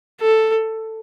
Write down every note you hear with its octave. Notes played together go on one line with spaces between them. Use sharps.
A4